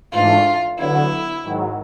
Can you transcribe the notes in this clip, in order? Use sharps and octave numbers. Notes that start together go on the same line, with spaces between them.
G#2 E3 A3 D4 F4
D3 F#3 B3 E4
G#2 D#3 F#3